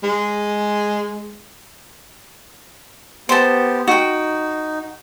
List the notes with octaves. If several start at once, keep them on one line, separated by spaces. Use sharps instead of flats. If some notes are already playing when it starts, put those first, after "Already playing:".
G#3
B3 G4 C5 A5
D#4 F#4 G5